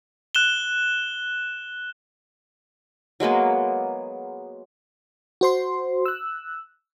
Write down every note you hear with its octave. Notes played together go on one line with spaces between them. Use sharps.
F#6 E7 G7
F#3 G#3 A#3 B3
F#4 C5 C6
E6 F#6